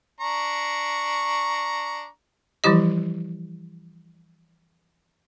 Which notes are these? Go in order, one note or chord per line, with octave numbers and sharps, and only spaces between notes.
D4 A#5 C#6
E3 F3 G3 E4 G4 D#5